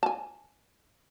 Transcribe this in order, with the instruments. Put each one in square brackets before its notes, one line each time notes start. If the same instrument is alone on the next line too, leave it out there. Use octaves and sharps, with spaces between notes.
[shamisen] G#5 A5